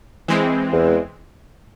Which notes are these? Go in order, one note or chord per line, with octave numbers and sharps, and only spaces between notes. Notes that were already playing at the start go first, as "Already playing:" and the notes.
E3 G#3 C4
E2